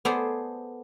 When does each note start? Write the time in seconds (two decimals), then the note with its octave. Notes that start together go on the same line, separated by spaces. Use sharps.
0.05 B3 G#4 A4 C5 D5